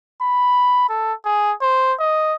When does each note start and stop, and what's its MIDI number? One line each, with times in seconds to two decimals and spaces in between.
0.22 0.87 83
0.90 1.13 69
1.25 1.53 68
1.62 1.93 72
2.00 2.35 75